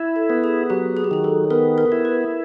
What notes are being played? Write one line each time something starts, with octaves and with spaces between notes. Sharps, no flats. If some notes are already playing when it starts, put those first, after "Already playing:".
Already playing: E4
A4
B3
G#4
F#3 G4
G#4
G4
D#3 G#4
A4
B3 A#4
A#4
E4
B4